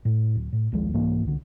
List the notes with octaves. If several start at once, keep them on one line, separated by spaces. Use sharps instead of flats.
A2
D1
A2
A#1 D#2 F3 G#3
C2 G#2 E3 A#3
C2 D3